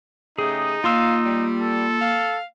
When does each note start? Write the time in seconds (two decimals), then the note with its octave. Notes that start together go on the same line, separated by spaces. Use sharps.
0.38 C#3 A3 D#4 G4 G#4
0.84 A#3 F4 F5 C6 E6
1.24 G3
1.61 A4
2.01 F5